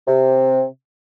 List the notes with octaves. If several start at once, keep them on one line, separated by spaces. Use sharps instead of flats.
C3